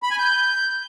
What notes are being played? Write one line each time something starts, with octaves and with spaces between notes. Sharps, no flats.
B5
G#5
G6